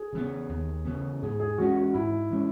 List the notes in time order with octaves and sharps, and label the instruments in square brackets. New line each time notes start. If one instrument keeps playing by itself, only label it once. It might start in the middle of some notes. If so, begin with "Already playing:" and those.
Already playing: [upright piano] G#4
[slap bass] C#3 E3 B3
D#2
C#3 E3 B3
[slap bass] G#2 [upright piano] G#4
[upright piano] G#4
[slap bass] E3 G#3 C#4 [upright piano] F#4
[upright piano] F#4
[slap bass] G#2 [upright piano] E4
[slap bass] E3 G#3 C#4